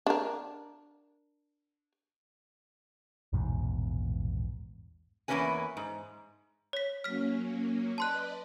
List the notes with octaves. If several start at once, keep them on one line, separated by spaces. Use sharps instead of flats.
D4 A#4
A#1 E2 G#2 B2
E2 G#2 A#3 C#4 B4 G#5
G#2
C#5 B6
F#3 A#3 C#4 F6 B6
B4 D5 D#5 A5 C6 F#6